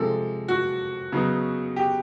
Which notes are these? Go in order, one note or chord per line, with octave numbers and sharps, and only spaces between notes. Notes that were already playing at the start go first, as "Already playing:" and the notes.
Already playing: C3 F3 G#3 A4
F#4
C#3 F#3 B3 D#4
G4